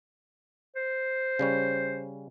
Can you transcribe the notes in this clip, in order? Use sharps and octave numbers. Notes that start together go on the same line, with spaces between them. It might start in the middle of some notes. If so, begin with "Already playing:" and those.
C5
C#3 G3 C#4